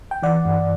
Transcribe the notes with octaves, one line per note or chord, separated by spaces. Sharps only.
G5
E3 D5 F#5
G2